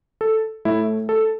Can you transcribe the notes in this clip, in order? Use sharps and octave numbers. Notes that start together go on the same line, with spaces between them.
A4
A2 A3 E4
A4